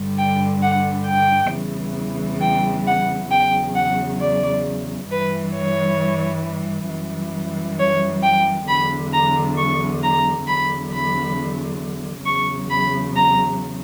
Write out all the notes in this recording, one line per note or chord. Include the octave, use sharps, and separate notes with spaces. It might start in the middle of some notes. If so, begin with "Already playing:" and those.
Already playing: G2 D3 G3
G5
F#5
G5
E2 C#3 E3 G3
G5
F#5
E2 C#3 F#3 G5
F#5
D5
G2 E3 G3 B4
C#5
F#2 E3 G3
C#5
G5
E2 D3 F#3 B5
A#5
C#6
A#5
E2 D3 F#3 B5
B5
E2 C#3 F#3 C#6
B5
A#5